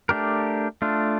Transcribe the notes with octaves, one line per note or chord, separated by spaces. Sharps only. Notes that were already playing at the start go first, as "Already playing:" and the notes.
A3 D4 G4 A#4
A3 D4 F4